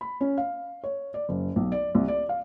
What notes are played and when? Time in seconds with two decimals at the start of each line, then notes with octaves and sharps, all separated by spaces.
0.01 B5
0.21 C#4
0.37 F5
0.84 C#5
1.14 D5
1.29 F#1
1.56 B1
1.72 D5
1.95 C2
2.08 D5
2.29 F5